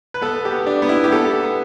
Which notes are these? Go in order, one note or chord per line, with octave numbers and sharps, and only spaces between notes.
B4
B3 A4
G4
B3
D4
B3
E4
G4
B3 A4
B3